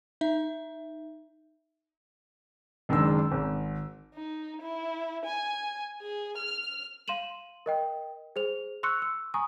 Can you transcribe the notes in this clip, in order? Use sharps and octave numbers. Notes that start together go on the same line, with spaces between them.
D#4 E5
F#1 D#3 G#3 D4 E6
G#1
D#4
E4
G#5
G#4
F6
F5 C6 D#7 E7 F#7
A#4 D#5 G5
G#4 C5 F7
C6 C#6 E6 F#6 C#7
E6
G#5 A#5 C#6 D#6